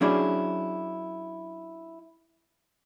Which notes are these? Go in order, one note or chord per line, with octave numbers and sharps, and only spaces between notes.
F#3 C#4 D4 E4 G#4